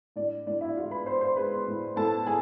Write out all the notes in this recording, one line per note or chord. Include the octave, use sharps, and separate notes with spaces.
A2 D4 D5
A2 D4 D5
E4 E5
G#3 F4 F5
B4 B5
G#3 C5 C6
C5 C6
G#3 B4 B5
A2
A2 A4 A5
A2 G#4 G#5